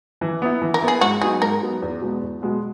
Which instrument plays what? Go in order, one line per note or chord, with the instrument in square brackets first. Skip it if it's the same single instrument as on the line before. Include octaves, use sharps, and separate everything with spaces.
[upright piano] E3
B3 E4
E3
[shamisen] A#4
[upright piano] B3 E4
[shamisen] G#4
[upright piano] G#2 [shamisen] F#4
[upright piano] F#3 B3 D#4 [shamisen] G#4
[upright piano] G#2 [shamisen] A#4
[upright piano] F#3 B3 D#4
E2
B2 G#3 B3
E2
B2 G#3 B3